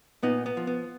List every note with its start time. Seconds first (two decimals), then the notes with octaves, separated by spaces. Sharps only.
0.23 A#2 B3 D#4
0.46 B3
0.57 F3
0.67 B3